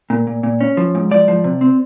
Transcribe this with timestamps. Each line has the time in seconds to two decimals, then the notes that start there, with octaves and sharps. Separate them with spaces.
0.10 A#2
0.27 A#2
0.43 A#2
0.61 C#4
0.77 F3
0.95 G#2
1.11 F3 D5
1.28 F3
1.44 C3
1.61 C4